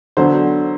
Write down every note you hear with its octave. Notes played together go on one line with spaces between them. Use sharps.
D3 F#3 B3 D4 C5